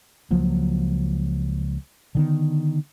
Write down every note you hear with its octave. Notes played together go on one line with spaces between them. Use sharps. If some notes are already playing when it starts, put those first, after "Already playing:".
C#2 F3 F#3 A#3
D3 D#3 B3